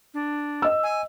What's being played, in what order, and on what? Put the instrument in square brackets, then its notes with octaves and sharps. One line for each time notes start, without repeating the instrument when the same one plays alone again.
[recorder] D4
[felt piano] D#5 E6
[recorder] G#5